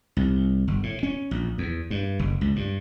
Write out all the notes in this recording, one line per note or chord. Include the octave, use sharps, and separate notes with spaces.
C2
G1
A2
C#4
A#1
E2
G2
F#1
C#2
G2